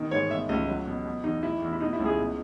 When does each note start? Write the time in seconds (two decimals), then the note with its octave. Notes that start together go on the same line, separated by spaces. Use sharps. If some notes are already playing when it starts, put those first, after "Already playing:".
Already playing: B2 D#3
0.11 G#2 C#5
0.30 B2 E5
0.49 C#2 D#5
0.68 F#3
0.87 B2
1.06 B2
1.24 E2 D#4
1.43 B2 E4
1.62 E2
1.73 E4
1.81 B2 D#4
1.93 E4
1.99 C#2
2.05 G#4
2.19 B2